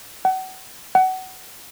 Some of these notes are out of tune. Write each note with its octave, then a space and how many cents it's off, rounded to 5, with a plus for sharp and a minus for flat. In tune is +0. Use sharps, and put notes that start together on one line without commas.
F#5 +30
F#5 +20